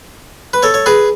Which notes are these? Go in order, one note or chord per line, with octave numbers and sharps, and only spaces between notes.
B4
A4 C#5
C#5
G#4 B4